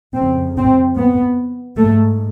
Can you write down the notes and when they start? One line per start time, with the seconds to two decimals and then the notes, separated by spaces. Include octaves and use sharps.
0.15 F2 C#3 C4
0.56 C4
0.96 B3
1.77 G#2 A3